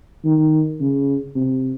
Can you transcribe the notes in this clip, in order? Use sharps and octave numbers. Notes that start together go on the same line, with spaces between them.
D#3
C#3
C3